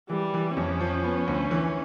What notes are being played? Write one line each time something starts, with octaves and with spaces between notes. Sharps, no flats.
E3 G3
E3
F2 C#4
F3
B3
D2
E3